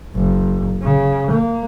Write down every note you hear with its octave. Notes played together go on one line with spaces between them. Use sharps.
F#1
C#3
A#3